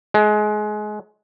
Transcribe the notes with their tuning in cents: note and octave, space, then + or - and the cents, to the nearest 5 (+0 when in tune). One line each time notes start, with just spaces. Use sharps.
G#3 +25